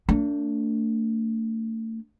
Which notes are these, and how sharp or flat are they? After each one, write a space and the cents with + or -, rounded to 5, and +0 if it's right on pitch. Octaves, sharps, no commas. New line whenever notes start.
A3 +35 D4 -20